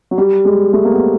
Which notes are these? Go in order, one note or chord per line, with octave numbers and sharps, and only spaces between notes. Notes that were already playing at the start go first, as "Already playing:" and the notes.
F#3
G3
G#3
A3
A#3
B3